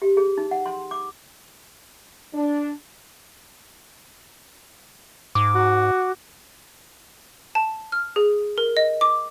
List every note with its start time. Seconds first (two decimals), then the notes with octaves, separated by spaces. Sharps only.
0.02 G4
0.17 G#4
0.38 D#4
0.51 F#5
0.66 C6
0.91 D6
2.34 D4
5.35 G#2 D6
5.55 F#4
7.55 A5
7.92 F6
8.16 G#4
8.58 A#4
8.77 D#5
9.01 D6